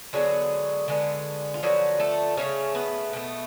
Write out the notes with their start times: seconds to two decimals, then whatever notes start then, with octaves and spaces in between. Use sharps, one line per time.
0.13 D3 F#3 G#3 B3 F#4
0.88 D3 G#3 B3
1.54 F4
1.63 D3 F3 F#3 B3 F#4
2.00 A3 A4
2.37 C#3 F3 A3 C#4 C#5
2.75 B3 B4
3.13 B2 A3